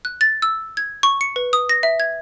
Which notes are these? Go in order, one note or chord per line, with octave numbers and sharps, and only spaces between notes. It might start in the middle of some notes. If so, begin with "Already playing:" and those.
F#6
A6
E6
G#6
C#6
C#7
B4
D#6
A#6
E5
G#6